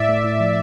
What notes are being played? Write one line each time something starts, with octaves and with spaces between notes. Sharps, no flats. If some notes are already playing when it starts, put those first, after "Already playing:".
Already playing: A2 D5 E5
A3
A2
F3